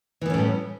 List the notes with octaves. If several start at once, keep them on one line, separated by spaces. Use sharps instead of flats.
A2 E3 G3 B3 C#4